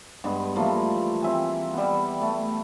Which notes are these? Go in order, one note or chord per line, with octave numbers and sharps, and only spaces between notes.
G2 G#3 B3
E3 F3 A3 A#3
C4 E5 G#5
G3 B3
A3